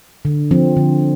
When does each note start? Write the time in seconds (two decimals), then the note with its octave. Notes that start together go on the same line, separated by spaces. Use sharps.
0.25 D3
0.51 F3 C4
0.77 D3